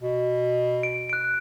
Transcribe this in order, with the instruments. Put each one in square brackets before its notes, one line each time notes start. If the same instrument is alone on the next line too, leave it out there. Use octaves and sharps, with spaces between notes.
[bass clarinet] B2
[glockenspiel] D7
F#6 D7